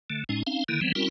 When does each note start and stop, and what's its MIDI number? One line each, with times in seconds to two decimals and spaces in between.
0.10 0.24 50
0.10 0.24 57
0.29 0.43 45
0.29 0.43 56
0.29 0.43 61
0.29 0.43 63
0.47 0.64 60
0.47 0.64 61
0.47 0.64 63
0.47 0.64 77
0.68 0.80 50
0.68 0.80 51
0.68 0.80 58
0.68 0.80 64
0.81 0.92 52
0.81 0.92 53
0.81 0.92 55
0.81 0.92 59
0.81 0.92 60
0.95 1.09 55
0.95 1.09 60
0.95 1.09 61
0.95 1.09 64
0.95 1.09 66
0.95 1.09 70